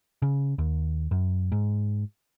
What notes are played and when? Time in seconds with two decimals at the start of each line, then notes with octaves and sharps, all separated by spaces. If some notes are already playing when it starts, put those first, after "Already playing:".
0.22 C#3
0.58 D#2
1.11 F#2
1.52 G#2